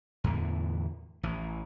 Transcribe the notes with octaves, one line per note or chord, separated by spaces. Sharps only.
E2 A2 D3 E3
A1 E3